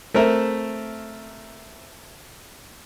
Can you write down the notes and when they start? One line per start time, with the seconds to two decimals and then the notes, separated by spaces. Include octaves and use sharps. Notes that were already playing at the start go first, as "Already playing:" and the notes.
0.14 A3 C4 A#4 E5